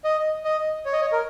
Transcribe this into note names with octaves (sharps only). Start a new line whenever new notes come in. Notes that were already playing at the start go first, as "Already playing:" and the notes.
D#5
D#5
C#5
D#5
C#5
A#4